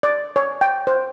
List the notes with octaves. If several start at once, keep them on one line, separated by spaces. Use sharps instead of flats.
D5
C#5
G5
C5